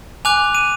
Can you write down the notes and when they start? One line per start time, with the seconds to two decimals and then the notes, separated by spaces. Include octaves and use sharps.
0.25 G#5 D6 F#6 F7
0.55 D#7